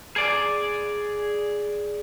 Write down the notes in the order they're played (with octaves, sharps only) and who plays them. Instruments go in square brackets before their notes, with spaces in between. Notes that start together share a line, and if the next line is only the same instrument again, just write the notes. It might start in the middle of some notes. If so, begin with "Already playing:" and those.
[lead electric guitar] G#4 D5